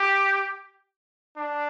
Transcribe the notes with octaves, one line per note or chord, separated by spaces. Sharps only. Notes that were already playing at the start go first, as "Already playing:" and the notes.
Already playing: G4
D4